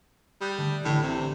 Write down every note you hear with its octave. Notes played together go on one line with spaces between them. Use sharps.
G3 D#6 F#6 G6
D3 A3
A1 A2 D3 C7
C3